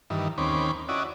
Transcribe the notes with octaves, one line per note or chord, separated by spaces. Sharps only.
G2 D#3 E3
D#2 C4 C#4 B5 D6
C#4 E4 F#4 D5 D#5